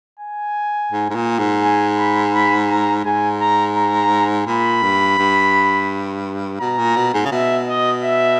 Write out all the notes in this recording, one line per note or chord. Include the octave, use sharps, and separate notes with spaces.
G#5
G#2
G#2
A#2
G#2
G#5
B5
B5
A#5
G#2 G#5
A#5
A#5
A#2 B5
G2
G2
B2 A#5
A#2
B2
G#2
C#3
B2 E5
D#5
E5